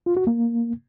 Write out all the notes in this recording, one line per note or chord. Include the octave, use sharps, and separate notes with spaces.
F4
F#4
A#3